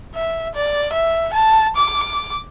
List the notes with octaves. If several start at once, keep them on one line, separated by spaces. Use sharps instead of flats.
E5
D5
E5
A5
D6